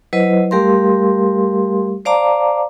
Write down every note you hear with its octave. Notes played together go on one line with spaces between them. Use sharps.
F#3 E4 B4 C5 D#5
G3 A3 G4 A#4 F5 C6
C5 D5 F5 A5 A#5 D6